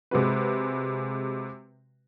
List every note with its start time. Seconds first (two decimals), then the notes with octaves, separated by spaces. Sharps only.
0.11 C3 G#3 F#4 B4